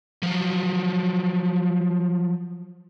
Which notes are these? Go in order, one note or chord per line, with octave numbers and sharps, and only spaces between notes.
F3 F#3